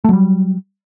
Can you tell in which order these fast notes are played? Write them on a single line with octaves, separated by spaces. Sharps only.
A3 F#3 G3